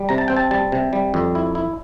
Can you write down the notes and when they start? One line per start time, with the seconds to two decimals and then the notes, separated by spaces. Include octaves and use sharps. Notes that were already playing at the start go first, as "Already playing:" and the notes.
Already playing: G3
0.09 C3 A#5
0.18 A5
0.28 C4 G5
0.37 A5
0.51 G3 A5
0.72 C3
0.93 G3
1.14 F2
1.35 E4
1.55 E4